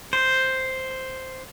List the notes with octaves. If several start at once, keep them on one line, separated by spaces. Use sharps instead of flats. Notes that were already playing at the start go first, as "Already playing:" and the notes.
C5